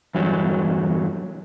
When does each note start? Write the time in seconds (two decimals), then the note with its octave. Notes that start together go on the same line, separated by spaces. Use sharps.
0.15 E2 G2 F#3